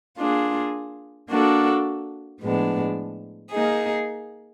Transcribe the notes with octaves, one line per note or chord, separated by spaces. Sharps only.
A#3 D4 F4 G#4
A#3 D4 F#4 A4
A2 F3 G#3 B3 D4
A#3 D#4 G#4